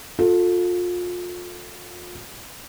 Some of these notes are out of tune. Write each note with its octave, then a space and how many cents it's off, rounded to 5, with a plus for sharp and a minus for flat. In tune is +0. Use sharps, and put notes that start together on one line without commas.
F4 +30 A4 +10